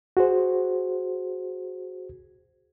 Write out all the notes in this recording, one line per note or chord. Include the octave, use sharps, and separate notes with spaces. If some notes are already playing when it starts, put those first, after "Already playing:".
F#4 G#4 C5